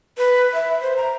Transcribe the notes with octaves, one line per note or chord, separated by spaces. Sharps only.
B4
E5
C5
A#5